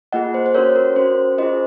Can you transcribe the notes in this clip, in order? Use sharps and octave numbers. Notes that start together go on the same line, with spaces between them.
A#3 F4 G#4 D#5 F#5
C5
C5
C#4 F#4 A#4 C#5
A#4
C#4 F#4 C5
C#4 F4 G#4 C5 D#5